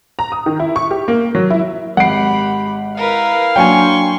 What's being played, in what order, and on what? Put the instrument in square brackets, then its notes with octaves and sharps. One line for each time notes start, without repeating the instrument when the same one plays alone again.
[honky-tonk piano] A#5
D#6
D#3
E4
C#6
G4
A#3
F#3
E4
[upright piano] G#1 D7 [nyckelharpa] G4 B5 [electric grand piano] F#5 C7
[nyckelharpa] E4 F5 [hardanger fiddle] A#4 B4
[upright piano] F#3 A#3 D4 [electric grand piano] G5 G#5 [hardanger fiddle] C6 C#6